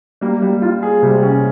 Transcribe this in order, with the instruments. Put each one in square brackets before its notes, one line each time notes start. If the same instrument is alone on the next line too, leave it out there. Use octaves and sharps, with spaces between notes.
[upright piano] G3 [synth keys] A#3
[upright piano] G3
F4
G#4
[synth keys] C3 [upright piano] G3
[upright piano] C#4